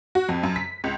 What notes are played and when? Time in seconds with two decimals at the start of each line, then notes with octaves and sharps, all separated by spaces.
0.15 F#4
0.29 F2
0.43 F#2
0.56 B6
0.84 C#2